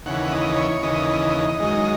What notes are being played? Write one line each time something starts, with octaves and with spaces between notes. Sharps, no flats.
D#2 C#3 E3 F#5
D#5
C#5
D#2 C#3 E3 D#5
F#2 D#3 G#3